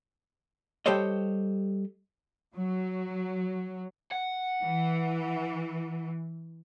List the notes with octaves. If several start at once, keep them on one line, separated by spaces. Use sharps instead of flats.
G3 G4 A4 C5 C#5 D#5
F#3
F#5
E3